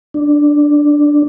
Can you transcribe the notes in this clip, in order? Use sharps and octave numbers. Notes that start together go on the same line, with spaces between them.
D4